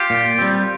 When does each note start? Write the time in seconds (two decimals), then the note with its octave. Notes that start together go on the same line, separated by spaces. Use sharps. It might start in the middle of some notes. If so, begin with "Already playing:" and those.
Already playing: F4 G4
0.10 A#2
0.39 G3 C4